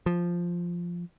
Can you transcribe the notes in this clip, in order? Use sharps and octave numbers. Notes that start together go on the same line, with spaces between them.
F3